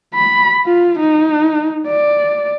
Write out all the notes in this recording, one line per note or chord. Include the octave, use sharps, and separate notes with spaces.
B5
F4
D#4
D5